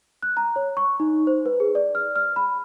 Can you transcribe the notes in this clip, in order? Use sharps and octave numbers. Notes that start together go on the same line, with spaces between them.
F#6
A#5
C#5
C#6
D#4
C5
B4
G#4
D5
F6
F6
B5